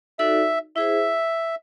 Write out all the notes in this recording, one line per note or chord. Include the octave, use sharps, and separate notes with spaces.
D#4 F#4 A4 D5 E5
E4 G#4 C5 E5